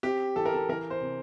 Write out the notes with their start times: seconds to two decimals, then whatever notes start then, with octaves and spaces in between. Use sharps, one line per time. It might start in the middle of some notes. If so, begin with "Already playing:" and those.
0.03 C4 G4
0.36 E3 A4
0.45 A#4
0.54 A4
0.69 E3 A#4
0.90 C5
1.01 C3